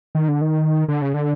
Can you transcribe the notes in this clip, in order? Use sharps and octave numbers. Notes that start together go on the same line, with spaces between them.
D#3
D3
D#3
D3
C#3
D3